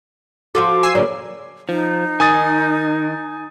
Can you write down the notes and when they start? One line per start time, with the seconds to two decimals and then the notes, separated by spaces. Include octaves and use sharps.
0.55 F3 F4 F#4 A4 D6
0.83 G#5 E6 C7
0.95 D2 A#2 C#3 F#3 A#3 D5
1.69 F3 D#4
2.20 D#3 G#5 D#6 A6